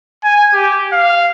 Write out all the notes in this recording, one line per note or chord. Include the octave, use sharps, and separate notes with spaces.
G#5
G4
F5